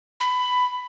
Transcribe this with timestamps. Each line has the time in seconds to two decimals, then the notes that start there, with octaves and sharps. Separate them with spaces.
0.20 B5